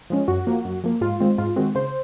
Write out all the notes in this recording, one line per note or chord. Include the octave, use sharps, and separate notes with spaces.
F3 G#3 C#4
F#2 F#4
F3 A#3
F#2
F3 A#3
G#2 F4
D#3 G#3 C4
G#2 F4
D#3 G#3 C4 F#4
C#3 C5